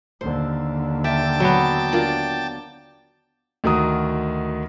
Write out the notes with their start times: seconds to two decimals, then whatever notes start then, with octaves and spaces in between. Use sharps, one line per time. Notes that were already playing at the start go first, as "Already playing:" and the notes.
0.21 D#2 D3 C5
1.04 E5 G5 A5 D6
1.40 F#3 B3
1.92 D4 F4 A#4
3.64 D2 D#3 F#4 A#5 D#6